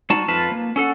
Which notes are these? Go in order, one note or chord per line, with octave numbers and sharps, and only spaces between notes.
G3 D#4 F#4 A5
F2 F4 B4 A5
A#3
C#4 A4 F#5